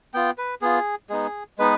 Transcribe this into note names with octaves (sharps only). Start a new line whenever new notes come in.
B3 F4 G5
B4
B3 F4 G#4
G#3 B3 D#4 G#4
G#3 B3 D#4 B4